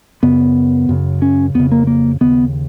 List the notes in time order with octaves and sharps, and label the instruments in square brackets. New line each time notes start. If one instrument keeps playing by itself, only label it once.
[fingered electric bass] F#2 C#3 B3
F#2 C#3
C#4
F2 C#3 B3
A#3
A#3
D#2 C#3 B3